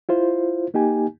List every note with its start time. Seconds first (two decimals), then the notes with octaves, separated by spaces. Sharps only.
0.09 E4 F4 C5
0.74 A#3 D#4 G4 G#5